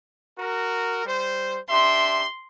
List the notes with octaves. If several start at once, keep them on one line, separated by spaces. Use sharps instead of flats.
F#4 A#4
G3 C5
D4 G4 E5 C6